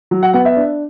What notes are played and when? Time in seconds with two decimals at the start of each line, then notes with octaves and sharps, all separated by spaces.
0.11 F#3
0.23 F#5
0.33 B3 F#5
0.45 E5
0.56 D4